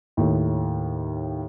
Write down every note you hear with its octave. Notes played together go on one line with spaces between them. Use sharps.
D#2 A2